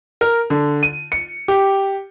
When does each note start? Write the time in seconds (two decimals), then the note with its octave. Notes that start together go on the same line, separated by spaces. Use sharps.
0.21 A#4
0.50 D3
0.83 D#7
1.12 C#7
1.48 G4